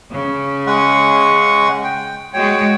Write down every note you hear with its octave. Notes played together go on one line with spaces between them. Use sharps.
C#3
G#3 F#5 C#6
G5
G#3 F#4 C#5 G5